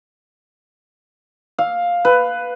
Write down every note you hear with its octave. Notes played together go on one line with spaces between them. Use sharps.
F5
B4